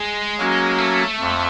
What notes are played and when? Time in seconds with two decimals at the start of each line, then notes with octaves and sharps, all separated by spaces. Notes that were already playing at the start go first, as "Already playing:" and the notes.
Already playing: G#3
0.38 F#3 A#3 C#4 F#4
0.78 A3
1.19 F2